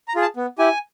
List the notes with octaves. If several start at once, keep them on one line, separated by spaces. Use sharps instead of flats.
A#5
F4 G#4
A5
B3
E4 G4 G#5